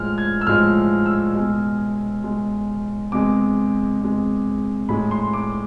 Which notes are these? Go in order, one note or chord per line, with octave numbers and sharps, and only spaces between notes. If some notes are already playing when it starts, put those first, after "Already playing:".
Already playing: A2 F3 G#3 F6
G#6
E6
A2 F3 G#3 F6
E6
B2 G#3
B2 G#3
E2 C3 G#3 D6
E2 C3 G#3
A2 G#3 B5
C6
D6